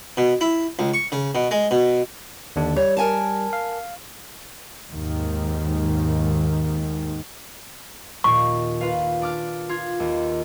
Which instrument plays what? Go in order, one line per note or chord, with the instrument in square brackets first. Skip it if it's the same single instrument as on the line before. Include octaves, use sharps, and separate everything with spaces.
[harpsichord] B2
E4
C#2
C#6
C#3
B2
G#3
B2
[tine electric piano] D#2 D3 D4
[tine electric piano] G3 [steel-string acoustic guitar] C#5
[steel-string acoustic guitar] A#4 G#5 A5
[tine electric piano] F5
[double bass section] D#2 G#2 D#3
[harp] D#2 A#2 [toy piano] C#6
[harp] F4 B4 F5
D4 D6 F6
F4 G#6
D#2